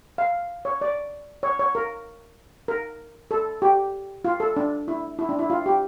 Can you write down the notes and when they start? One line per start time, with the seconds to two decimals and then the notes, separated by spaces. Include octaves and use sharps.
0.18 F5
0.65 C#5
0.81 D5
1.43 C#5
1.59 C#5
1.75 A#4
2.68 A#4
3.31 A4
3.62 G4
4.25 F4
4.40 A4
4.57 D4
4.88 E4
5.19 E4
5.29 D4
5.39 E4
5.50 F4
5.66 G4